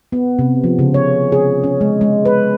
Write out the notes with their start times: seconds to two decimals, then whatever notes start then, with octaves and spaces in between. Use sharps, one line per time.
0.12 B3
0.39 C3
0.64 F3
0.79 C#3
0.94 C#5
1.32 G#4
1.64 C#4
1.81 G#3
2.01 G#3
2.25 B4